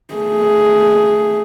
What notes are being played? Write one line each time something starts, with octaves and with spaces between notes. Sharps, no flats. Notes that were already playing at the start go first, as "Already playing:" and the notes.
A3 G#4